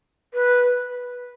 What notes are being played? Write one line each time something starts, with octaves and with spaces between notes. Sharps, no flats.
B4